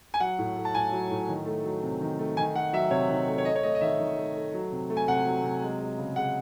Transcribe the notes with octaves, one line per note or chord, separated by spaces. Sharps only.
G#5
F#3 F#5
A2
A3
A5
A2 G#5
F#3
A2
D#3
A3
F#3
C3
D#3
A3
D#3 G#5
A3 F#5
F#3 E5
C3 C#5
D#3
A3
C#5
A3 D#5
C#5
A3 D#5
D#5
D#3 E5
D#3
A3
A3
F#3
C3
A3
G#5
C3 F#5
F#3
C3
G#3
G#3
C#3
C#3 F#5